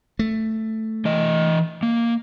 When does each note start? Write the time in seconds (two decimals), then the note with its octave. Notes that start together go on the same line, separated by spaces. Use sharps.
0.19 A3
1.05 E3 D#5
1.83 A#3